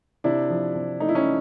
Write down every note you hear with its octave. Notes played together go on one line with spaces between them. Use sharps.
C3 D4 E4
F3
C3
A3 D#4
E4
C#4 D#4